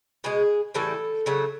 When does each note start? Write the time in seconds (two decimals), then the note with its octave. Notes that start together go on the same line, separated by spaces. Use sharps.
0.24 B2 G#3 G#4
0.74 A2 E3 G3 A4
1.26 C#3 F#3 A3